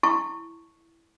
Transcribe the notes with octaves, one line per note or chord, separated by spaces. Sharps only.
E4 A5 C#6